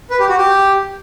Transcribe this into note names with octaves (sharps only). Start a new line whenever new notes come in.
B4
G4
F#4
G4